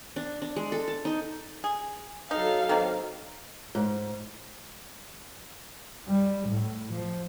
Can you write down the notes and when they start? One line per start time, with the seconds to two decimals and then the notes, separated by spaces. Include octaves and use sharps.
0.16 D4
0.42 D4
0.56 G#3
0.72 A4
0.88 A5
1.05 D#4
1.64 G#4
2.31 F#3 D#4 A4 F5
2.69 D#3 A#3 C4
3.75 G#2
6.07 G3
6.47 A2
6.91 F3